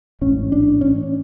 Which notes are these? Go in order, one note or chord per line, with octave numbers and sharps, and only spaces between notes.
A1 G#2 C#4
D4
C#4